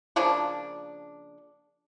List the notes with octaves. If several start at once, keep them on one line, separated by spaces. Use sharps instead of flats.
C#3 F3 A#3 D4